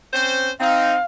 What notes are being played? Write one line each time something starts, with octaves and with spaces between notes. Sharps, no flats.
C4 C#4 C5
C4 D#4 F5